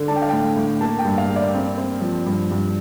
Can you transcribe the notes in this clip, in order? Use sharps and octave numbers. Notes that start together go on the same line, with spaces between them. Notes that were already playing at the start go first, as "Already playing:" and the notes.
Already playing: D3
D4 A5
G5
F5
A2 G5
A2
A#3 A5
G5
G2
F5
A#3
D5
C4
C4
F3
G2
G2